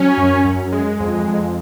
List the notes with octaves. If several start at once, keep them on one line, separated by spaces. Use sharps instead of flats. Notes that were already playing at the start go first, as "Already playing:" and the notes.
Already playing: F#3 C#4
F#2
F#2
G#3
F2
F2